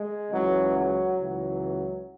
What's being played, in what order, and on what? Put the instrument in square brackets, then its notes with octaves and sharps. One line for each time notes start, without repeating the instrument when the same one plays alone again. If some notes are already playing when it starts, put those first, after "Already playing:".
Already playing: [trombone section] G#3
C#2 C#3 E3 F#3
F#3
C#2 C#3 E3 F#3